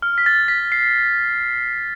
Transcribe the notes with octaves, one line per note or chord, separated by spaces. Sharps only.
F6
B6
A6
B6
C7